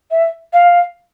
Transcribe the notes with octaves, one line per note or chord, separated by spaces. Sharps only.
E5
F5